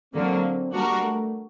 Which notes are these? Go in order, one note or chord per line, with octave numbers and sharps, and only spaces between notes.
D3 F#3 A#3 C4
G3 A#3 D4 F#4 A#4
A3